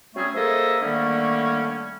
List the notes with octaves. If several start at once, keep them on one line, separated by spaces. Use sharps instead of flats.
F#3 G3 A3 C4 C#4 G#4
A#3 G#4 A4 C5 D#5 E5
D3 D#3 G3 A3 A#3 C#4